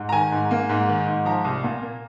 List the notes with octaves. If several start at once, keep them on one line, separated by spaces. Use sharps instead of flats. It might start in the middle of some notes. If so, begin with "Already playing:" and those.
Already playing: G#2
A#5
D#3 G#5
G#2
A#3
G#2
D#3
G#2
F3 A#5
C2
A#2
A#3